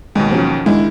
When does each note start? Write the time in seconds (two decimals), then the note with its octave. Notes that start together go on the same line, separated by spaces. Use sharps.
0.15 D#2 B2 G#3
0.31 F3 F#3 C#4
0.66 D#3 G#3 D4 E4